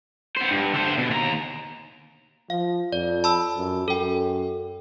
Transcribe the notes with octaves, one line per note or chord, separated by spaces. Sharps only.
B3 C5
G2
D3 C5
B2
D#2 A#5
F3 F5
F2 D5
A5 B5 E6
F#2
F#2 A4 G5